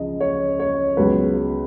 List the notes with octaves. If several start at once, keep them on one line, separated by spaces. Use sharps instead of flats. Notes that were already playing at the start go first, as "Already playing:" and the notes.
Already playing: C#2 C#3 F3 D#5
C#5
C#5
C#2 B2 F#3 B4